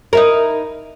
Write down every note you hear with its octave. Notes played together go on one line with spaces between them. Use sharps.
D#4 E4 A#4